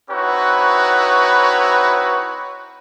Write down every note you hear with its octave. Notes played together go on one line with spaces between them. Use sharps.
C4 D#4 E4 F#4 B4 C#5